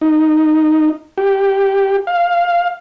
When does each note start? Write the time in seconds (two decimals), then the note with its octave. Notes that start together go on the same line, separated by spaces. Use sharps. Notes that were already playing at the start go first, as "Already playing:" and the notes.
0.01 D#4
1.18 G4
2.07 F5